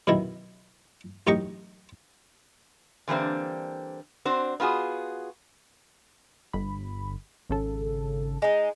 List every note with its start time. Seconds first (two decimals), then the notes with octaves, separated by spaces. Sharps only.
0.07 F#2 B2 D#3 E4
1.27 A1 F#2 D#4 G4 D#5 C#6
3.08 D3 E3 G3 A#3 C4 D4
4.25 C4 D4 F#4 C5
4.60 B3 F4 F#4 G#4
6.53 G1 B5
7.49 G#1 C#3 A4
8.42 G#3 D#4